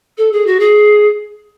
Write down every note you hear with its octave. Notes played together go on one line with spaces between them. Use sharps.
A4
G#4
F#4
G#4